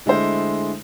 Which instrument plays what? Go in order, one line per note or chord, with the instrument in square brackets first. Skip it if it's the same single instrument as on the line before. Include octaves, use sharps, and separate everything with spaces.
[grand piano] D3 G#3 A3 E4 C5